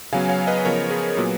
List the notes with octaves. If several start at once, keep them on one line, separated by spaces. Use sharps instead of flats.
C#3 F#3 B3 F5 G#5
C#5 F5
B4 D#5
C#3 F3 B3 A#4 C#5
G#4 B4
A#2 F#3 B3